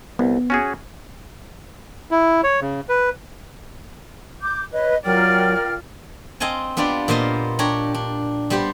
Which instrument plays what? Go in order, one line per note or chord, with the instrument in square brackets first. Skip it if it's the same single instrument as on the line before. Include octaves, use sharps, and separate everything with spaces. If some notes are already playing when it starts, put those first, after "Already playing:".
[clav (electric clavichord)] C2 [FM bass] B3
[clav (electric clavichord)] C#4 F#4 G#4
[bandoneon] E4
C#5
C#3
B4
[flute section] D6 G6
[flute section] B4 C#5 [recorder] D#5
[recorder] F#3 [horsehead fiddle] F4 D5 [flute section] A#4 G5 F6
[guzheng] C4 D#5 F5 G#5 A5
B3 D4 F4 G4 D5
A#2 B3 A#4 C5 D#5 F5
D4 G4 C#5 A#5
D4
G3 B3 G4 C5